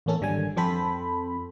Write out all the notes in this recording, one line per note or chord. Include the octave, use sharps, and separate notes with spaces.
A1 E2 A#3 C#4 A4
G#1 D3 G3 G#5
F2 F3 C4 A4 C5 B5